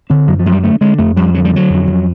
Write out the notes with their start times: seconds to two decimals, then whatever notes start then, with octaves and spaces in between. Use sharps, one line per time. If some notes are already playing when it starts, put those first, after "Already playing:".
0.10 D3 C4
0.27 F#2 F#3
0.39 F3
0.46 F#2 G#3
0.52 G3
0.64 D3 A3
0.81 D3 G#3
0.98 F2 A3
1.17 F2 G3
1.34 D3 F#3
1.45 G3
1.52 D3 F#3
1.70 F2
1.87 F2